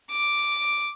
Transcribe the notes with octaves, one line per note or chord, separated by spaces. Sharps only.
D6